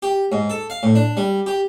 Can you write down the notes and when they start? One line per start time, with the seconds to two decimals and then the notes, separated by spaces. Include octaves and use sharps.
0.03 G4
0.32 G#2
0.50 A4
0.70 F5
0.83 A2
0.95 D4
1.17 G3
1.46 G4